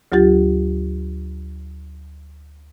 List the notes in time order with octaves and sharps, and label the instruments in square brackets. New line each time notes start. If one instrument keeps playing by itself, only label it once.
[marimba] D2 F#3 F4 G4 A6